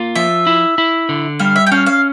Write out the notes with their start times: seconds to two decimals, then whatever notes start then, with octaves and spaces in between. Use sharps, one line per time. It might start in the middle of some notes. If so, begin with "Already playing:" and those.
Already playing: A#3 F4
0.15 F3 E5
0.47 E4
0.78 E4
1.09 D3
1.39 G3 F5
1.56 E5
1.67 G5
1.72 C#4 F5
1.86 F5